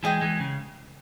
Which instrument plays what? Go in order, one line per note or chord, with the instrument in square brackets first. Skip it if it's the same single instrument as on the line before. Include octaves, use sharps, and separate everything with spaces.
[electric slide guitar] E3 G#3 [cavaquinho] G#4 D#5 G5
[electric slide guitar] E3 G#3
C#3